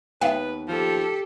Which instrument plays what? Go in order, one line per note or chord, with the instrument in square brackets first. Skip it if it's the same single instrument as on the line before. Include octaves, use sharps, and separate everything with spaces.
[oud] D#2 B3 [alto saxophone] B4 [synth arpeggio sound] E5 F5 G5
[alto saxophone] F3 [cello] G4 A4